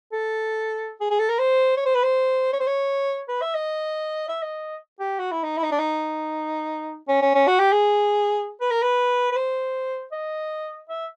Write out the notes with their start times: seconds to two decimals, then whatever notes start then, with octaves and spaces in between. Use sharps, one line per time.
0.12 A4
1.01 G#4
1.11 G#4
1.20 A4
1.29 A#4
1.39 C5
1.77 C#5
1.86 C5
1.95 B4
2.03 C5
2.53 C#5
2.60 C5
2.67 C#5
3.28 B4
3.42 E5
3.54 D#5
4.29 E5
4.42 D#5
5.00 G4
5.19 F#4
5.31 E4
5.43 D#4
5.57 E4
5.63 D#4
5.72 D4
5.79 D#4
7.09 C#4
7.22 C#4
7.34 C#4
7.47 F#4
7.59 G4
7.72 G#4
8.61 B4
8.71 A#4
8.82 B4
9.32 B4
9.36 C5
10.12 D#5
10.89 E5